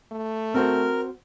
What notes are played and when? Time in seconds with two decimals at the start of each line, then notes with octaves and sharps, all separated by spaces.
0.12 A3
0.54 C4 F#4 A#4 C5